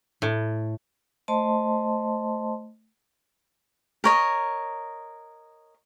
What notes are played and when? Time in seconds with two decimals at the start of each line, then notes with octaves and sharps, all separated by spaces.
0.22 A2
1.28 A3 C5 D#5 A5 C6
4.04 A#4 C#5 D#5